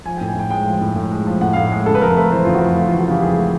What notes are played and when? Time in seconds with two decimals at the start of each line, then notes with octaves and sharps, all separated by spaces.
0.05 F3 G#5
0.17 G5
0.21 A2
0.28 G#5
0.35 A2 G5
0.50 G#3 G5
0.66 F3
0.81 A2
0.96 A2
1.11 G#3
1.27 F3
1.41 A2 F#5
1.53 F5
1.57 A2
1.72 G#3
1.86 C#3 A4
1.95 B4
2.01 F2 A#4
2.17 A3 B4
2.31 E3 C5
2.45 C#3 F4
2.54 F#4
2.62 F2
2.77 A3 F4
2.88 F4
2.92 E3
3.00 F#4
3.08 C#3 G4
3.22 F2 G#4
3.37 A3